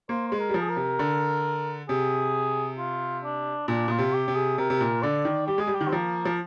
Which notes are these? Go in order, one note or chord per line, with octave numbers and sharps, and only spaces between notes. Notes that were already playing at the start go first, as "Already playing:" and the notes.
A#3 C5
G#3 C5
A#4
G3
F3
G#4
A#4
C3
D3
C3 G#4
F4
D4
A#2 D4
A#2 F4
C3
G4
C3
G#4
C3 A#4
C3
A#2
D3 D5
D#3
G3 G4
G#3 G#4
G3
G4
D#3
C4
F3 A#3
F3